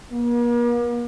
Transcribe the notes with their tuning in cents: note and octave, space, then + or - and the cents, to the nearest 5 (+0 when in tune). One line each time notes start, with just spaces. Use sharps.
A#3 +45